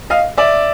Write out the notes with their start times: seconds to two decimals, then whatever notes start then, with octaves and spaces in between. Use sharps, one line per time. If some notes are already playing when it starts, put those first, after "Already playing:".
0.10 D#5 F5
0.37 D5 E5